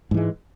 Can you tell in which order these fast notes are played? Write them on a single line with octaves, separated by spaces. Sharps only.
G#2 E3 G#3